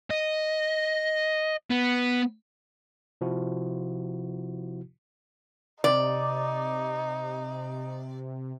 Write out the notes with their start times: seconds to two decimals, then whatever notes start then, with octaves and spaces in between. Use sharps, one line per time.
0.11 D#5
1.70 B3
3.21 C3 F3 E4 F#4
5.84 C3 D#4 D5